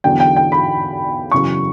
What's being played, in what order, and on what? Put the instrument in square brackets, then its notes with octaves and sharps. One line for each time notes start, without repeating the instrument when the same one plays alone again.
[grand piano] E2 D3 F#3 G5
G5
G5
B5
F#2 C#3 E3 C#6